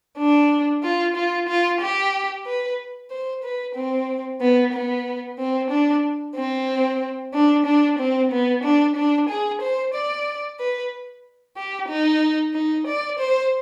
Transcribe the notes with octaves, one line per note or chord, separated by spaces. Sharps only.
D4
F4
F4
F4
G4
B4
C5
B4
C4
B3
B3
C4
D4
C4
D4
D4
C4
B3
D4
D4
G#4
C5
D5
B4
G4
D#4
D#4
D5
C5